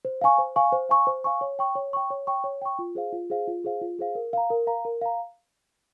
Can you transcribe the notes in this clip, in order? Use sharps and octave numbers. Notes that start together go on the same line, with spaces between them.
C5
F5 G#5 C#6
C5
F5 G#5 C#6
C5
F5 G#5 C#6
C5
F5 G#5 C#6
C#5
G5 C#6
C#5
G5 C#6
C#5
G5 C#6
C#5
G5 C#6
F4
G#4 C5 F5
F4
G#4 C5 F5
F4
G#4 C5 F5
F4
G#4 C5 F5
A#4
F5 A#5
A#4
F5 A#5
A#4
F5 A#5